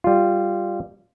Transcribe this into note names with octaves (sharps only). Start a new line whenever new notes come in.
G3 F4